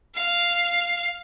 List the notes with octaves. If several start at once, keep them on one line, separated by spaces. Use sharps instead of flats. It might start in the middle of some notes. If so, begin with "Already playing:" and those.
F5